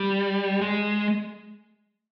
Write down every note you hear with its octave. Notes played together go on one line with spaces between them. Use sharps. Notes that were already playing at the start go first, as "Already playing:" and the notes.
Already playing: G3
G#3